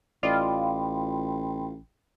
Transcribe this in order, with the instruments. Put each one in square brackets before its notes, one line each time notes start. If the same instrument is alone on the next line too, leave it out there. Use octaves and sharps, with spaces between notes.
[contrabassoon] A1 [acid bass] F4 [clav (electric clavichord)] D5 D#5 [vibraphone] G5 B5 C6